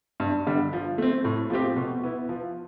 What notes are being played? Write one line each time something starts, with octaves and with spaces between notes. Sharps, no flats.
G2
D3 G3
F3
A3 C4
A2
F3 A3 C4 G4
B2
B3 E4
F3